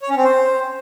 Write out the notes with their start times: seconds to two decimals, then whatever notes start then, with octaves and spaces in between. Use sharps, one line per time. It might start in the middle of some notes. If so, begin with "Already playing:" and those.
0.02 C#5
0.10 C#4
0.17 C4
0.24 C5